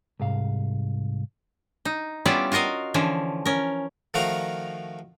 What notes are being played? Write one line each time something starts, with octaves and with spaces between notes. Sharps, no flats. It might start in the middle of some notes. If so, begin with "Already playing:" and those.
C2 G#2 F5
D#4
G3 B3 C#4 E4 F4 D5
F4 F#4 A#4 D#5 F5
D3 E3 F3 C#4
C#4 A#4
D#3 F3 A3 F#4 F5 A#5